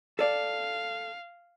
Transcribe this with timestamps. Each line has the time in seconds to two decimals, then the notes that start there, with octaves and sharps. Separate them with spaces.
0.19 A4 D5 F5